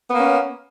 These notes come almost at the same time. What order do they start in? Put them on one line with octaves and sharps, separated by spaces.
B3 A#3 C#4